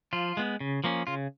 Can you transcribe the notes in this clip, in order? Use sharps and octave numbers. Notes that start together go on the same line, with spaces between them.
F3 F4
G#3 B3
C#3
F3 A#3 C#4
C#3 F4